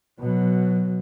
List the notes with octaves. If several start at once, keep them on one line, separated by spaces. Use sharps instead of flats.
B2 F#3